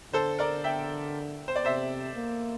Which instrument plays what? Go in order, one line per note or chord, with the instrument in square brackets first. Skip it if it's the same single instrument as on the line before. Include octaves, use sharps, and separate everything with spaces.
[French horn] D3 [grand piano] A4 C5
[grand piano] A#4 D5
E5 G5
C5
D5
[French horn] C3 [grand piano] C5 E5
[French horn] A#3